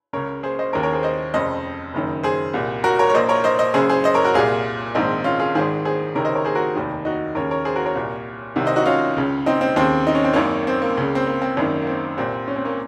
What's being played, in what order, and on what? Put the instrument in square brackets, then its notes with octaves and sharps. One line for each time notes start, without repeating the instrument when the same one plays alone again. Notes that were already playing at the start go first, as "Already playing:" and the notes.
[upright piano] C#2 C#3 A#4 C#5
G#4 C5
C5 D#5
D#2 C#3 A#4 C#5
A#4 C#5
G#4 C5
C5 D#5
F1 F2 C#3 C5 D#5
F#1 F#2 D#3
G#4 C5
C2 A#2
F#4 A#4
A#4 C#5
C#5
A#1 A#2 C5 D#5
A#4 C#5
C5 D#5
C5 D#5
F#1 F#2 C#3 G#4 C5
G#4 C5
C5 D#5
A#4 C#5
F#4 A#4
C2 A#2 F4 G#4
A#1 G#2 D#3 C4 D#4
C#4 F4
F4 G#4
G#1 G#2 D#3 G#4 C5
G#4 C5
C#2 C3 D#3 A#4 C#5
C5 D#5
A#4 C#5
G#4 C5
F#4 A#4
F1 D#2 D#3
D#4 F#4
D#2 C#3 A#4 C#5
A#4 C#5
G#4 C5
F#4 A#4
A#4 C#5
C2 A#2
C2 C3 D#3
C5 D#5
D#4 F#4
C#4 F4
C#2 C#3
C4 D#4
C4
D#2 C#3 C4
D#4
C#4
C4
G#1 F#2 D#3 A#3 C#4
C4
A#3
C#2 C#3
C4
A#3
C4
G#1 F#2 D#3 A#3
A#3
C4
C2 A#2 C4
C#4
C4
A#3 C#4